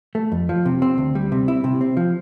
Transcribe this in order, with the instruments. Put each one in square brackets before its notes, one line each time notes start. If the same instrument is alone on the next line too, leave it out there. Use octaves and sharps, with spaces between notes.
[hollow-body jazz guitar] A3
F2
F3
C3
C4
D2
G3
C3
E4
C3
C4
F3